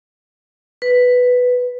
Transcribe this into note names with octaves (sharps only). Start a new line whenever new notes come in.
B4